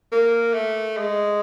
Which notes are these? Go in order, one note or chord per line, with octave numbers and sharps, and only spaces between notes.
A#3
A3
G#3